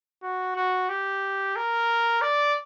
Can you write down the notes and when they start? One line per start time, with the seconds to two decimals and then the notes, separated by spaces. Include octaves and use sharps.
0.23 F#4
0.56 F#4
0.89 G4
1.56 A#4
2.21 D5